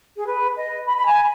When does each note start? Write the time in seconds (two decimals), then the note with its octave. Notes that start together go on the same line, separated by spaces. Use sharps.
0.17 G#4
0.27 B4
0.57 D#5
0.86 B5
0.97 B5
1.06 G#5